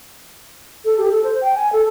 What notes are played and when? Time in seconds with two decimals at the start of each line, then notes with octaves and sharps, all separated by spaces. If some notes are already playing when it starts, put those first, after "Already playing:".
0.85 A4
0.98 G4
1.10 A4
1.24 C5
1.41 G5
1.55 G#5
1.73 A4